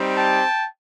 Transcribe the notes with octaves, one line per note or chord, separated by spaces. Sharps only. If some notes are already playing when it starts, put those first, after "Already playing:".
Already playing: G3 C4 D#4 G4
G5 A5